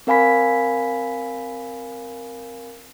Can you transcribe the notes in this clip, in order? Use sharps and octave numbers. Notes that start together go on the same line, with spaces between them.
C4 A#4 F5 G#5 B5 B6